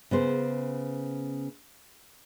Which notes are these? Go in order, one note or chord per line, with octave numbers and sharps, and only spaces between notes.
C#3 B3 C5